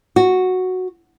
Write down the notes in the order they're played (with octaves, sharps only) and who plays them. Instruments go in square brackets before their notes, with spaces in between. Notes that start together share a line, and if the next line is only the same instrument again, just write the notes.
[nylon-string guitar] F#4